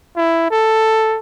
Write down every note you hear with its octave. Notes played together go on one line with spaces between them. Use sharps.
E4
A4